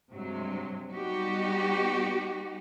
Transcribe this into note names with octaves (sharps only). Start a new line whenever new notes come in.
G2 C3 F#3 G#3
G3 B3 D#4 F#4 G4